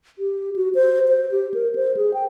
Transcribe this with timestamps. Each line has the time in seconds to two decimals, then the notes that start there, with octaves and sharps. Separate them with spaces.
0.19 G4
0.56 F#4
0.75 C5
1.08 C5
1.31 G4
1.54 A#4
1.75 C5
1.97 G#4
2.14 G5